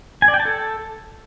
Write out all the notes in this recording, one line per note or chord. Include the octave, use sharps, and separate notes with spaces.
G#5
D5
G5
A5
A4